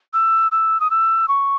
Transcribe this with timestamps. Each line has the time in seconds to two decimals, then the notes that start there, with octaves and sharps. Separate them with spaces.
0.14 E6
0.52 E6
0.80 D#6
0.90 E6
1.28 C#6